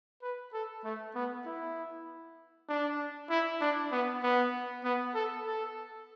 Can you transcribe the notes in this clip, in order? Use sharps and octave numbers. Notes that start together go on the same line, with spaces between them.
B4
A4
A3
B3
E4
D4
E4
D4
B3
B3
B3
A4
A4